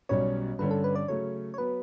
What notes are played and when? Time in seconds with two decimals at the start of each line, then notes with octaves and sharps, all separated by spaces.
0.09 B1 B2 G3 C#4 C#5
0.59 G2 D3 G3 C#4 B4
0.71 A4
0.84 B4
0.95 D5
1.08 C#3 F#3 A3 C#4 C#5
1.54 C#5
1.58 F#3 B3 B4